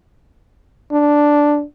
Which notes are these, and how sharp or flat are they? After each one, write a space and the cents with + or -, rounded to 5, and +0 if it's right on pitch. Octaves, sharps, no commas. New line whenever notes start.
D4 +0